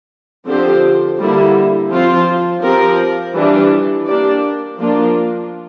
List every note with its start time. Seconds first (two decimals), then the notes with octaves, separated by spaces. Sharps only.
0.46 D3 F3 C4 G4 C5
1.19 D3 G3 A#3 E4
1.91 F3 C4 F4 C5
2.62 F3 C4 G4 A#4
3.34 E3 G3 D4
4.06 A#3 D4 G4 D5
4.78 F3 A#3 D4 F4